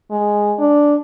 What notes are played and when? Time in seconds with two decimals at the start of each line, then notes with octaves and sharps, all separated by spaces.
0.11 G#3
0.58 D4